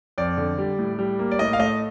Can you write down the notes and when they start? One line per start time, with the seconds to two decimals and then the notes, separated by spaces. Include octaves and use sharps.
0.18 F2 D5
0.38 D3
0.58 G3
0.79 A2
0.99 G3
1.19 A#3
1.31 D5
1.39 A2 D#5
1.53 F5
1.60 A3 D#5